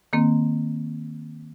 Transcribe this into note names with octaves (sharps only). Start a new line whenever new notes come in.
D#3 A#3 C4